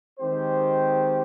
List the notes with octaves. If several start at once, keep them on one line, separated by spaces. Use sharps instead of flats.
D#3 G#3 C4 G4 C5